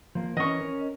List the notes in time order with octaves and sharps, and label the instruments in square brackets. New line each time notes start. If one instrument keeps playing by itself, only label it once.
[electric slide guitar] F3 A#3
[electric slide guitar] E3 C#4 A#4 [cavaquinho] D#5 C#6
[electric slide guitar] C#4 A#4